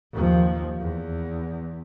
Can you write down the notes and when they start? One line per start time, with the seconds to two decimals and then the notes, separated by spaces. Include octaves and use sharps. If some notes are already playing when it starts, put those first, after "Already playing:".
0.13 D#2 F3
0.81 E2